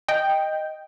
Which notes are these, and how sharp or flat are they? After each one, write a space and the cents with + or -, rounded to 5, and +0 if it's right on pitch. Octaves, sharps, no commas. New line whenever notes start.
D#5 +0 G5 +0